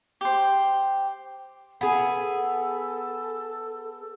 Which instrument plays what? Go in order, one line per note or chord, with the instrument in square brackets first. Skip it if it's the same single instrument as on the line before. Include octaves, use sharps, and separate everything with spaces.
[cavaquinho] G4 C5
[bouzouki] B3 G#4 [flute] A4